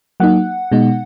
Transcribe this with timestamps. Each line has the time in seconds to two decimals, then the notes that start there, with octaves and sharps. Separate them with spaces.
0.20 F#3 A#3 D#4 F#5
0.72 B2 G#3 D#4